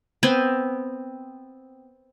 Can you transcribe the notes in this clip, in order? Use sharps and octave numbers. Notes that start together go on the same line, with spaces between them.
B3 C4